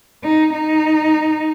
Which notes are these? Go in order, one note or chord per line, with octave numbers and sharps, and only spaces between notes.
D#4
D#4